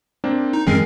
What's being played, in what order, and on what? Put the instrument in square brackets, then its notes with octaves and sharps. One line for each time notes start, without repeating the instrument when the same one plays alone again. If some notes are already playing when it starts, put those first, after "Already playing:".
[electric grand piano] A#3 C4 D4
[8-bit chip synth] D#4
[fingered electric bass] G2 E3 F#3 [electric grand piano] G#3 C7 [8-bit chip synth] C4 C#4 A#4